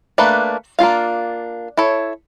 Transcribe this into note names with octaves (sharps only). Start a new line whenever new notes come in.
A3 A#3 D4 B4
A#3 D4 F4 F5
E4 A4 C#5